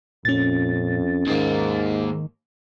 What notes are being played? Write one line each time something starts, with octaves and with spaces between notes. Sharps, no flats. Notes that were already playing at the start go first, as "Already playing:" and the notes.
F2 A#2 C#4 A6
D#2 G#2 D#3 A#3